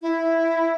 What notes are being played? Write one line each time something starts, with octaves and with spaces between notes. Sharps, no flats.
E4